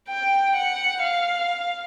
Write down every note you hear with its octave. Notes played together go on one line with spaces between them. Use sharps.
G5
F#5
F5